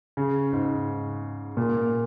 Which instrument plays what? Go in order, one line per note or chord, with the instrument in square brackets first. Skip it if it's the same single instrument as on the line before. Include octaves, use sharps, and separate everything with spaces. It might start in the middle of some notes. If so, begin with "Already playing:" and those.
[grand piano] C#3
G#2
A#2